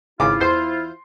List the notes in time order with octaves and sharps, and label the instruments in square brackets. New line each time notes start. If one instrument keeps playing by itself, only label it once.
[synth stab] G#1 G#2 C#3 [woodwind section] E4 F4 [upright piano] D6
[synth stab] E2 C5 G6 [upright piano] C6 C7